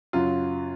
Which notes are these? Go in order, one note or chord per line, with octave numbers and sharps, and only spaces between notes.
F#2 C#3 F#3 F4